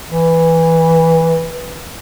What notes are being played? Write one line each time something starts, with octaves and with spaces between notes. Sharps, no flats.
E3